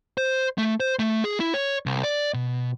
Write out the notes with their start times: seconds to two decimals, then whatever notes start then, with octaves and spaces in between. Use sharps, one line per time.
0.18 C5
0.58 A3
0.80 C5
0.99 A3
1.24 G#4
1.40 E4
1.54 C#5
1.86 C2
2.04 D5
2.34 B2